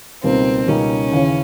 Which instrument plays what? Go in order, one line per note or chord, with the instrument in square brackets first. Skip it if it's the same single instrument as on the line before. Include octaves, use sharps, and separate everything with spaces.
[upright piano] C#2 B2 G3 A#3 D#4 [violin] C4
[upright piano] C#2 B2 G3 A#3 D#4 [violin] C#4
[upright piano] D#2 C#3 E3